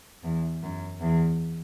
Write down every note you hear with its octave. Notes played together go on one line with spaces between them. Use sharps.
E2
F#2
E2